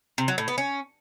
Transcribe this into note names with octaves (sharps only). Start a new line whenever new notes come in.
C3
F#3
A2
B3
C#4